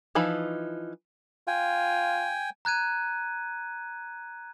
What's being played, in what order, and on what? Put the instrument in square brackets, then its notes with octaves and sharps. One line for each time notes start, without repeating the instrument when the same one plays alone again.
[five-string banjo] E3 F3 D#4 B5
[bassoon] F4 [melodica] G5 G#5
[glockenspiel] A#5 F#6 G#6 D#7